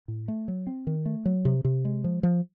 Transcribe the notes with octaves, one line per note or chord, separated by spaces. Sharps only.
A2
A3
F#3
C4
D#3
A3
F#3
C3
C3
G#3
F3
F3